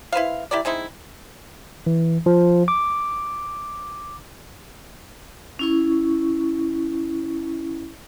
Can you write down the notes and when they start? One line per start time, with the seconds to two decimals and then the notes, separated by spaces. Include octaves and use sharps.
0.12 E4 B4 C5 F5
0.51 E4 G4 A#4 D5
0.65 G#3 C4 D#4 E4
1.86 E3
2.26 F3
2.68 D6
5.59 C#4 E4 C#6